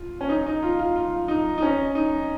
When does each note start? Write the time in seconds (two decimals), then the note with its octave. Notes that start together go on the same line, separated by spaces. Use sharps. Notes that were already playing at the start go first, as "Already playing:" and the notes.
Already playing: F4
0.21 C#4
0.29 D#4
0.47 D#4
0.63 F4
0.79 F4
0.96 F4
1.28 D#4
1.58 D#4
1.62 C#4
1.95 D#4